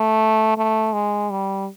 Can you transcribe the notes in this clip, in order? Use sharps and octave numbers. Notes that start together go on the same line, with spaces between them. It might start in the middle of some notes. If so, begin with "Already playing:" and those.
Already playing: A3
A3
G#3
G3